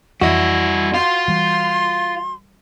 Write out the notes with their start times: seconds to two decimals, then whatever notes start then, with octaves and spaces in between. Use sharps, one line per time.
0.22 F2 E3 G3 E4 F#4 D#5
0.94 F4 F5 C6
1.28 E3 G3